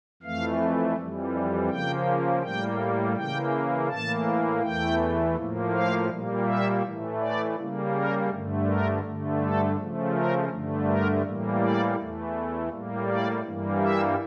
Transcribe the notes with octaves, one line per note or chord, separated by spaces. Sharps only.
F2 E3 A3 F5
F2 E3 G3
C#3 F3 A#3 G5
A2 G3 A#3 G5
C#3 E3 A#3 G5
A2 E3 A#3 A5
E2 E3 A3 G5
A2 F3 A#3
F5
A#2 G3 A#3
E5
A2 E3 A3
D5
C#3 G3 A#3
A#4
G2 D3 A3
A#4
G2 D3 A3
A4
C#3 F3 A3
A#4
G2 D3 A3
A#4
A2 E3 G3 A#3
D5
E2 E3 A3
A2 G3 A#3
D5
G2 E3 G3 A#3
E5